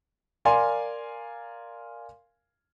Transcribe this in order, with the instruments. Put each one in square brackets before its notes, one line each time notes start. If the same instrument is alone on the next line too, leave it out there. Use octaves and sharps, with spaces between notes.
[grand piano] A#4 D5 F5 G#5 C6